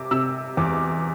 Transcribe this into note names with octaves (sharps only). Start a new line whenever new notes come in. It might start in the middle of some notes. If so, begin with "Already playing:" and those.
Already playing: C3 D6
C3 E6
E2 D6